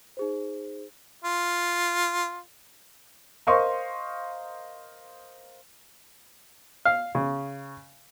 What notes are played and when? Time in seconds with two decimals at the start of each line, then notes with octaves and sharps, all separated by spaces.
0.17 D#4 G#4 C5
1.24 F4
3.47 A#4 C5 D#5 F5 C6 C#6
6.85 F5
7.15 C#3